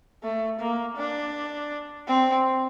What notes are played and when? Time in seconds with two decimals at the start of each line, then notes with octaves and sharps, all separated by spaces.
0.23 A3
0.59 A#3
0.97 D4
2.08 C4